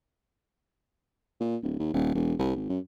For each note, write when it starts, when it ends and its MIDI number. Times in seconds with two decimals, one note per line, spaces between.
1.40 1.56 46
1.63 1.78 26
1.79 1.91 39
1.93 2.11 27
2.15 2.34 28
2.39 2.53 36
2.56 2.64 32
2.69 2.79 42